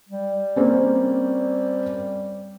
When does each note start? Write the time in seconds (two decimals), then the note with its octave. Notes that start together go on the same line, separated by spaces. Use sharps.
0.09 G3
0.56 A#3 C4 C#4